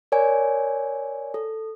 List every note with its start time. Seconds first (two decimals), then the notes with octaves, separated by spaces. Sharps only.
0.12 A#4 C#5 D5 G#5
1.34 A4